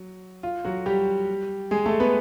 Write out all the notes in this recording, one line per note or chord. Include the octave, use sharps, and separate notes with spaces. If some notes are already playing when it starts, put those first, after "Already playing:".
Already playing: F#3
F4
F#3 F#4
G3 G4
G#3 G#4
A3 A4
B3 B4